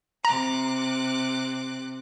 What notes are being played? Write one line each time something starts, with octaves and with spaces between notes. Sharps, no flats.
C3 A#5 D6 F#6